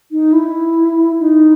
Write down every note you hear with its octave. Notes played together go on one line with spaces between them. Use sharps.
D#4
E4
D#4